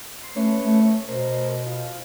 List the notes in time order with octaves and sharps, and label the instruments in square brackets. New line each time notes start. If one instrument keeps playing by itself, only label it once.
[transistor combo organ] C6
[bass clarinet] A3 [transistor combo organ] C#4 B4 C#5
[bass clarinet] A3
[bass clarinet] B2 [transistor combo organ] A#4 C5
[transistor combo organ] F4